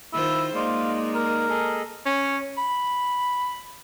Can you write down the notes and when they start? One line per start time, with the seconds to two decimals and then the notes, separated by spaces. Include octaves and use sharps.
0.13 D#3 E4 F4 C5
0.55 G#3 A#3 D#4 F4 D5
1.15 A#4
1.49 G#4 A4 D#5
2.06 C#4
2.58 B5